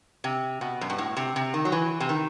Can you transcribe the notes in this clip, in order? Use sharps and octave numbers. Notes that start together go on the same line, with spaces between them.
C3
B2
F#2
G2
A2
C3
C3
D#3
F#3
E3
C3
D#3